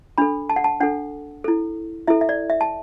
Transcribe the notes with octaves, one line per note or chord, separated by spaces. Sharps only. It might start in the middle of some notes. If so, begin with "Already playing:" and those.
D4 A4 B5
A5
F#5
A5
D4 A4 F#5
E4 A4
E4 A4 E5
E5
D5
E5
A5